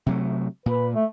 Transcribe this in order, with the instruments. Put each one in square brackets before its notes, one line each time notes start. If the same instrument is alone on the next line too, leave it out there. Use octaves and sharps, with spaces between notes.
[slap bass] C3 F#3 A3
[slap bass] A#2 [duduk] B4
[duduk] A3